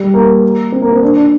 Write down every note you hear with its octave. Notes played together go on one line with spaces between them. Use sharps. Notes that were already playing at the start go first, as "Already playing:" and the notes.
Already playing: G3
A#3
C4
A#3
C4
D4
D4